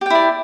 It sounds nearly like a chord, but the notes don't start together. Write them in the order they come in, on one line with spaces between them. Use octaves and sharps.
G4 G5 E4 D5